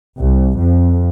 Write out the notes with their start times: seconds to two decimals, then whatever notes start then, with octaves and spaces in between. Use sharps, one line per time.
0.18 C2
0.58 F2